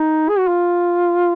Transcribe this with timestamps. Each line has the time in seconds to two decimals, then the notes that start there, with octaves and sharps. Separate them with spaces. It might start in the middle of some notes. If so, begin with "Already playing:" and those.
Already playing: D#4
0.29 G#4
0.38 F#4
0.48 F4